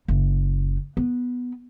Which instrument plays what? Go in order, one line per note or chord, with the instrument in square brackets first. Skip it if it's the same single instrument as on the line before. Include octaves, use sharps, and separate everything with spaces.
[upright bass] F#1
B3